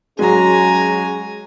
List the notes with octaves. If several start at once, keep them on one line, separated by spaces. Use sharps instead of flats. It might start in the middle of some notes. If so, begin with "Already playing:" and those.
F#3 G#3 C#4 F#4 G#4 G#5 A#5